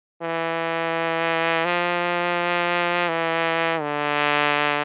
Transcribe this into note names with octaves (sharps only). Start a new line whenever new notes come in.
E3
F3
E3
D3